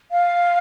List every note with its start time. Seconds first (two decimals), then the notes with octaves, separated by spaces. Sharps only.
0.11 F5